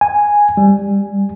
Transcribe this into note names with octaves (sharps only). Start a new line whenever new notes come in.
G#5
G3